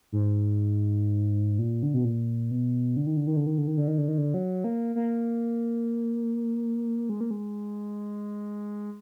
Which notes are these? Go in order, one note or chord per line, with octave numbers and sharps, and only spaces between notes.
G#2
A#2
D3
B2
A#2
B2
D3
D#3
D3
D#3
D3
D#3
D3
D#3
D3
D#3
D3
D#3
D3
F#3
A#3
A#3
G#3
A#3
G#3